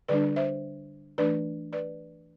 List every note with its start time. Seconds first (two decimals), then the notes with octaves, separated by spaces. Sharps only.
0.08 D3 G3 D4 B4 D5
0.36 C5 E5
1.18 E3 A3 D4 B4 D5
1.73 B4 D5